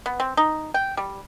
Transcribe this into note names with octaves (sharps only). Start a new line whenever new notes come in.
B3
C4
D#4
G5
G3